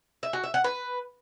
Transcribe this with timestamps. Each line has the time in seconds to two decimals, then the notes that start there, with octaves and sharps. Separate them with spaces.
0.23 E5
0.33 F#4
0.44 E5
0.54 F#5
0.64 B4